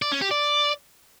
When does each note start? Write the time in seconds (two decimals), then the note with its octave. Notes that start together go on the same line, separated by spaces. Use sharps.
0.02 D5
0.12 C#4
0.21 G4
0.31 D5